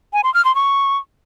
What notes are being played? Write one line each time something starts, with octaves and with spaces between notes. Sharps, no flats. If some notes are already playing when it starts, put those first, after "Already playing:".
G#5
C6
F6
C6
C#6